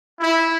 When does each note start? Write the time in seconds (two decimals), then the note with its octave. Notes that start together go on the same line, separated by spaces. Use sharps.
0.20 E4